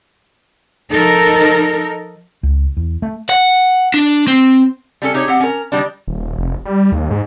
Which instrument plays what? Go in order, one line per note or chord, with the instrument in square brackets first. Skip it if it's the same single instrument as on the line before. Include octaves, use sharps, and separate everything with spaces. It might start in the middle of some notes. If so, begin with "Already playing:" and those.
[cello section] F3 D#4 A4 A#4
[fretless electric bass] C#2
E2
A3
[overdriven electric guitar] F#5
D4
C4
[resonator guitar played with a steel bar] G3 C#4 A4
D#4 G4 G#4 C#5
C4 G4 F#5
C#4 A#4
D#3 G3 D4
[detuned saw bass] D#1
F1
G3
D#2
G#2